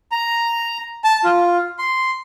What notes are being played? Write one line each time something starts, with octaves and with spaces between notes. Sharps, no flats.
A#5
A5
F4
C6